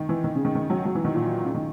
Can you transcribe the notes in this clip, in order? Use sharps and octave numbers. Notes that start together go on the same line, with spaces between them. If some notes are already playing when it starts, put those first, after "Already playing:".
Already playing: D#3
E3
D#3
C#3
D#3
D#3
F#3
F#3
E3
D#3
A#2
C#3
D#3